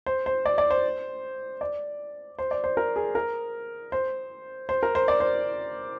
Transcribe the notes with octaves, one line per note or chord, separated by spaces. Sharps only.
C5
C5
D5
D5
C5
D5
C5
D5
C5
A#4
G#4
A#4
C5
C5
A#4
C5
D5
C5